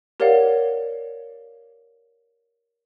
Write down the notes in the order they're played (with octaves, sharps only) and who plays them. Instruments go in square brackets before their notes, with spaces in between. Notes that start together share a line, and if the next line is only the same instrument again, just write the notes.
[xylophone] G4 A#4 C#5 D5 F5 F#5